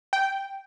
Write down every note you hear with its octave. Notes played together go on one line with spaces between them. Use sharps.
G5